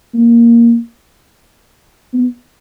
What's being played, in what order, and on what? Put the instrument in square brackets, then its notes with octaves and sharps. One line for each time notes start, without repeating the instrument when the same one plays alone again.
[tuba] A#3
B3